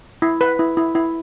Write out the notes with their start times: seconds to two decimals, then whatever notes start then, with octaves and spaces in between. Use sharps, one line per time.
0.22 E4
0.41 B4
0.59 E4
0.77 E4
0.95 E4